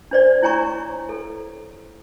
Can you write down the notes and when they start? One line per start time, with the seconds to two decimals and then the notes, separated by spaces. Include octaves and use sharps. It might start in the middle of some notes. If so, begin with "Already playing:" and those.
0.11 D4 C5 D5
0.42 E4 C#5 G#5 A#5 C#6
1.09 A4